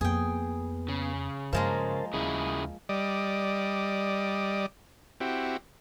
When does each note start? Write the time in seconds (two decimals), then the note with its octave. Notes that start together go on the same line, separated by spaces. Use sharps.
0.01 F2 A#3 B3 G#4 G5
0.88 C#3
1.53 G2 F3 G#3 A#3 A#4 C5 A5
2.13 D#2 C#3 E4 G#4 D#6
2.89 G3 D5 D#5
5.20 C4 E4 F#4 G4